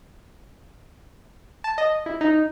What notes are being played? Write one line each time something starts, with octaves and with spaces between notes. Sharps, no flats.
A5
D#5
E4
D#4